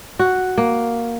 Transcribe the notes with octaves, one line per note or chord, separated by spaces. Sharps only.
F#4
A#3